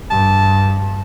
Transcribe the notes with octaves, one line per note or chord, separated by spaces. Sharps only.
G2 A5